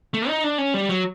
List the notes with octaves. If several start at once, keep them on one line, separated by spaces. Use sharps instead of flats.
A3
D#4
D4
C#4
G3
F#3